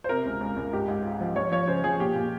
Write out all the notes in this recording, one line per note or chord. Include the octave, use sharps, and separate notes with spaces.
C5
C3 A#4
C#2
C#2
C#2
G#2 G4
G#2
F4
F3
F3 C#5
F3 C#5
C#3 C5
F3 G#4
A#2 G4
A#2